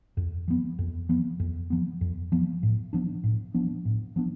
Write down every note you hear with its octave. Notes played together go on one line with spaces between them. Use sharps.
F2
F3 B3
F2
F3 B3
F2
F3 B3
F2
F3 B3
A2
F3 B3 D4
A2
F3 B3 D4
A2
F3 B3 D4